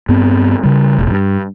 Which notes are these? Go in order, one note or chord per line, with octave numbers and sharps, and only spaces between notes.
G2 B3 C4
C#3 G3
E1 A1
G2